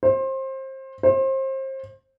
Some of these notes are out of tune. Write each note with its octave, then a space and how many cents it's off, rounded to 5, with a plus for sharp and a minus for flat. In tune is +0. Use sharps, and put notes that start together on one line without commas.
C5 +25
C5 +30